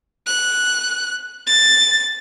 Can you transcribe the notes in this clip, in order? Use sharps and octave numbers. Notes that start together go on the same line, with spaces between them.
F#6
A6